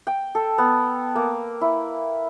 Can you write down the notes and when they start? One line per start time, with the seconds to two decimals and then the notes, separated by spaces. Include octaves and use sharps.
0.07 G5
0.35 A4
0.58 B3
1.15 A#3
1.61 E4